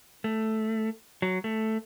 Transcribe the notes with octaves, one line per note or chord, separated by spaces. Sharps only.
A3
F#3
A3